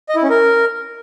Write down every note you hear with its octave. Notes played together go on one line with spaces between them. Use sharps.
D#5
E4
C#4
A#4